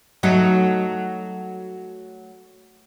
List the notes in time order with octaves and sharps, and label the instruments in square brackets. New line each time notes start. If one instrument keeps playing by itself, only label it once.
[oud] F#3 A3 D#4